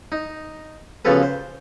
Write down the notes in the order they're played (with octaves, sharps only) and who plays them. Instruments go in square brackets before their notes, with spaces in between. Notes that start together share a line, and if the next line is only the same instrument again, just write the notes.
[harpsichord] D#4
C#3 F3 B3 F#4 A4 B4
C5